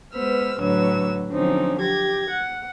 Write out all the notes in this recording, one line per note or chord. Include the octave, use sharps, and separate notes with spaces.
G#3 B3 B4 C5 E6 F6
A2 D3 F#3 B4 C#5 E6
D3 F3 F#3 C4 C#4 D#4
G4 G#6 A#6
F#5